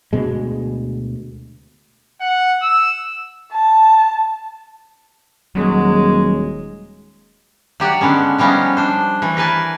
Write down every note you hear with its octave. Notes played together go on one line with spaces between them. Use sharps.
D2 B2 G#3
F#5
E6
A5
D#1 F#3 G#3
F#3 G4 D5 F#5
D3 G#3 B3 C#4
F3 G3 B3 C#4 D#4 F4
D4 C5
E3 A3
A#4 B4 G#5 A5